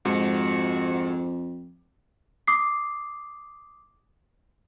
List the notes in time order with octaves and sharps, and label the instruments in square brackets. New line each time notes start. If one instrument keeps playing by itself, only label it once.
[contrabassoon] F2 [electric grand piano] G#2 [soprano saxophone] F#4
[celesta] D6 D#6 C7